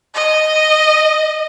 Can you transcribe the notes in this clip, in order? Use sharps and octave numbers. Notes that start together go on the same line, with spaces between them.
D#5